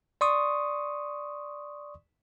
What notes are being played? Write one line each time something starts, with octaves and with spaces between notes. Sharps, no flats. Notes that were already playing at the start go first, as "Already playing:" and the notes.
D5 C6 C#6 D#6